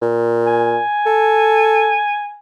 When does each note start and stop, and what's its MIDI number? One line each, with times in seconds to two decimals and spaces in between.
0.01 0.79 46
0.46 2.38 80
1.06 2.00 69